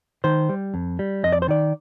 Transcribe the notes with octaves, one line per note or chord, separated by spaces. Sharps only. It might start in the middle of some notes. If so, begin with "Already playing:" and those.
D#3 C5
G3
F2
G3
F2 D#5
D5
C5
D#3 D5